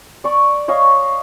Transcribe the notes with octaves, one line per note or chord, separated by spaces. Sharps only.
D5 C#6
C#5 D#5 F5 C#6